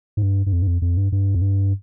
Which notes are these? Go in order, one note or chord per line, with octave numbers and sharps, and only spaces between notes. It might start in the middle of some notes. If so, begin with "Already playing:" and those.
G#2
G2
G2
F2
G2
F2
F2
G2
G2
F2
G2